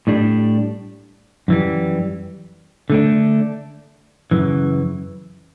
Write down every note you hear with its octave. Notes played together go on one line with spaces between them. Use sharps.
A2 G3 D4
F#2 E3 G3
D3 A3 D4
F#2 C#3 E3